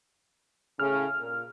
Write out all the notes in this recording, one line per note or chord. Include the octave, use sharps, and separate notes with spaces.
A2 C#3 F6
A#2